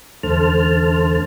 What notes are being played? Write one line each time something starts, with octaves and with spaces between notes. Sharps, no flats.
E2 D3 A3 C5 A5 F6